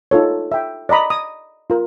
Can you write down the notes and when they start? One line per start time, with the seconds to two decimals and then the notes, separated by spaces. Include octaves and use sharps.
0.11 D#4 F4 A4 C#5
0.52 E5 G5
0.89 D5 D#5 A#5 B5 D#6
1.10 D#6
1.70 F4 A#4